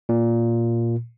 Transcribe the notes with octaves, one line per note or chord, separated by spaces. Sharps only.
A#2